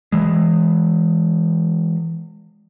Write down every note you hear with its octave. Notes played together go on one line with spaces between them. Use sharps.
E3 G#3